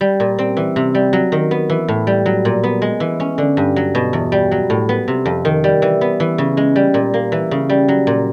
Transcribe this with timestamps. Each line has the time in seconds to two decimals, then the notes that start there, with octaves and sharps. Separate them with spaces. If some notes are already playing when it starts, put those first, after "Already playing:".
0.01 G3
0.20 A#2
0.38 C4
0.57 E3
0.76 C3
0.94 G3
1.13 F#3
1.32 D#3
1.51 B3
1.70 E3
1.88 A2
2.07 G3
2.26 F#3
2.45 A#2
2.63 B3
2.82 G#3
3.00 E3
3.20 C#4
3.38 D3
3.57 G2
3.76 F#3
3.95 B2
4.13 E2
4.32 G3
4.51 F#3
4.70 A2
4.89 B3
5.08 C3
5.25 F2
5.45 D#3
5.64 G3
5.82 E3
6.01 B3
6.20 E3
6.38 C#3
6.57 G#3
6.76 G3
6.94 A#2
7.14 A#3
7.32 E3
7.51 C#3
7.69 G3
7.88 F#3
8.07 A#2